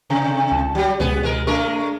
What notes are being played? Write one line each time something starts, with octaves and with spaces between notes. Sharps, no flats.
C3 A#5
C#2 A5
F#3 G3 G4
C#2 B2 B3 G#4
G#3 A#4
G#3 A3 D4 A#4 C#6